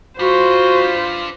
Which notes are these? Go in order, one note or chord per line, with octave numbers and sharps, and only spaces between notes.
D4 F4 F#4 B4 C5